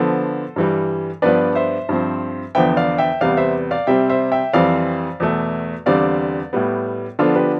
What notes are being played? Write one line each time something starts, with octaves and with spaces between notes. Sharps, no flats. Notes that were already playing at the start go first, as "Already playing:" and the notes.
Already playing: D3 F3 B3 A4 C5
G2 E3 G3
G2 F3 B3 D4 B4 D5
C5 E5
G2 F3 C4
E2 D3 F3 B3 E5 G5
D5 F5
E5 G5
E2 C3 G3 B3 D5 F5
C5 E5
D5 F5
C3 G3 C4 E5 G5
C5 E5
E5 G5
F2 E3 G3 C4 D5 F5
E2 B2 A3
E2 D3 G3 C4 D5 F5
A2 G3 B3
D3 F3 B3 D4 F4 A4
G4 B4